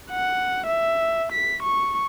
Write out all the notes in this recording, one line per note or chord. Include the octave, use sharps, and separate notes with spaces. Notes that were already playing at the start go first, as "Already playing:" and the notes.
F#5
E5
B6
C#6